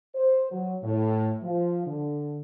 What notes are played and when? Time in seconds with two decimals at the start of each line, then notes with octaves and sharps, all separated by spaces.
0.15 C5
0.51 F#3
0.83 A2
1.43 F3
1.87 D3